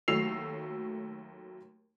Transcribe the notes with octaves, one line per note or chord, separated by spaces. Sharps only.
D#2 F#3 A3 E6 C7 F7